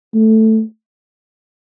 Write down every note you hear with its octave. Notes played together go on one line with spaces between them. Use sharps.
A3